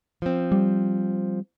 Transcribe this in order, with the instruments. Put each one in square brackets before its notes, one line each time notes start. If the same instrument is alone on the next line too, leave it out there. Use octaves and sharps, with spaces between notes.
[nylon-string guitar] F3 C4
[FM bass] G3